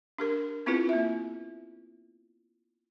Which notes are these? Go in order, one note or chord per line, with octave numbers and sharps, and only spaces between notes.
D4 G4 A#4
B3 C4 E4 F4 G#4 B4
A#3 E5